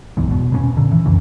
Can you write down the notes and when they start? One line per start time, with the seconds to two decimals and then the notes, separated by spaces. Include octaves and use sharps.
0.17 E1 B1 E2 G#2
0.31 B2
0.52 B2 B3 C#4
0.77 A#2 D3
0.92 E3
1.06 C#2 F#2 C#3 E3